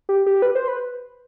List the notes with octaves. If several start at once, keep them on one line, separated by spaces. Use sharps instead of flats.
G4
G4
B4
C5
B4